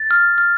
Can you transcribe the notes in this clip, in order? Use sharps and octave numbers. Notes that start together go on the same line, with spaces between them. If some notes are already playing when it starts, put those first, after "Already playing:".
Already playing: A6
F6
F6